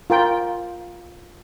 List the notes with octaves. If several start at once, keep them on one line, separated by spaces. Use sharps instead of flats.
F4 A#4 G5